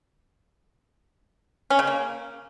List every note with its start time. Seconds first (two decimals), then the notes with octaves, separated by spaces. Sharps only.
1.70 C#4
1.79 C#3
1.87 A#3